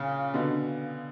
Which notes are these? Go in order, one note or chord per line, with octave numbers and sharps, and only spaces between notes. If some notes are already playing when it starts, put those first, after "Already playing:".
Already playing: A#2 C#3
B2 D3